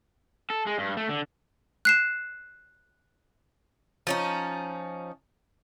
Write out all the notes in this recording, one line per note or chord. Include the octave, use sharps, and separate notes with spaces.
A4
G#3
G2
A3
D3
F#6 C7 E7
F3 C#4 D#4